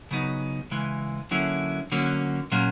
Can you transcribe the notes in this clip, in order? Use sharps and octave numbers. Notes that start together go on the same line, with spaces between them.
C#3 F#3 B3 D#4
C#3 E3 G#3
D3 F#3 A#3 C#4 E4
D3 F#3 A#3 C#4
A#2 F#3 A#3 C#4